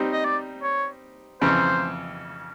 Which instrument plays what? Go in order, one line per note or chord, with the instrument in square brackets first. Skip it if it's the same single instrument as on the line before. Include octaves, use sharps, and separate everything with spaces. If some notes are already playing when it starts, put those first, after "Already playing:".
Already playing: [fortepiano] G3 C4 D#4
[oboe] D#5
D5
C#5
[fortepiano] F2 C#3 E3 [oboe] C5